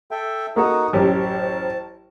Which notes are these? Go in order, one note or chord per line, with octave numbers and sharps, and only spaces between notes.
A4 E5 G5
A#3 D#4 F#4 A4 D#6
A1 F#2 G4 C5 A5